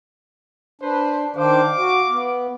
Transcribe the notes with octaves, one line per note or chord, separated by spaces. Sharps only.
D4 B4 C5
D#3 D4 C5 F5 D6
F#4
B3